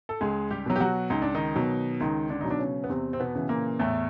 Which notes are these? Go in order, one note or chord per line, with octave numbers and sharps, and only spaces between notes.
A4
C#2 G#3 G#4
G3 G4
B2 F#3
G4
F#3 F#4
C#2 D#4
D4
D#3 D#4
B2 F#3
C#2 D#3 D#4
D3 D4
B2 F#3 D#4
D4
C#3 C#4
B3
E2 C3 C4
C4
B2 B3
C#3 E3
A#2 A#3
E2 A2 A3